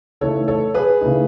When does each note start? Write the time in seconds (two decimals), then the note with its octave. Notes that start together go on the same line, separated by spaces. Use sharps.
0.21 C#3 E3 A3 D#4 A4 C#5
0.48 A4 C#5
0.74 G#4 B4
1.01 C#3 E3 A3 D#4